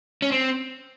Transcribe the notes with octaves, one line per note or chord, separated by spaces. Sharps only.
C#4
C4